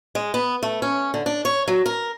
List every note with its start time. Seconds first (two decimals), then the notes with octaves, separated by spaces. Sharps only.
0.15 G#3
0.34 B3
0.63 A3
0.82 C#4
1.14 D3
1.26 D4
1.45 C#5
1.68 F#3
1.86 A#4